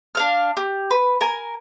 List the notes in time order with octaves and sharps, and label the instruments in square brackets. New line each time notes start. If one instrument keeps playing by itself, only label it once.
[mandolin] D4 F5 F6
G4
B4
A#4 G#5